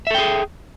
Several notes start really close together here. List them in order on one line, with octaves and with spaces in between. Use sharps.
E5 A4 G5 G#4